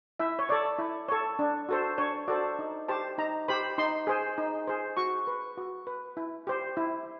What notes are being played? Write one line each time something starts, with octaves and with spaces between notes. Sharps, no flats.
E4 E5
C#5
A4 C#5 D5
E4
A4 C#5
D4
F#4 A4 C5
D4 C#5
F#4 A4 C5 D5
D#4
G4 C5 A5
D#4 A#5
G4 C5 B5
D#4 C6
G#4 C5
D#4
G#4 C5
F#4 C#6
B4
F#4
B4
E4
G4 C5
E4